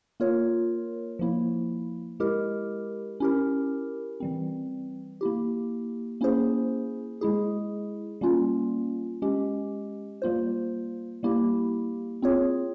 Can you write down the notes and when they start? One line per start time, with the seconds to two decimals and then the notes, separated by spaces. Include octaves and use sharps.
0.20 A#3 F4 A#4 C#5
1.19 F3 A#3 E4
2.20 G#3 E4 G4 A#4
3.20 C#4 E4 G4 A#4
4.20 E3 G3 C4
5.21 A#3 E4 G4
6.21 A#3 C#4 E4 G#4 C5
7.21 G#3 E4 G#4
8.21 G3 A#3 C#4 F4
9.22 G#3 C#4 G4
10.22 G3 A#3 F4 C5
11.23 G3 A#3 E4 G4
12.22 C4 F4 G#4 C#5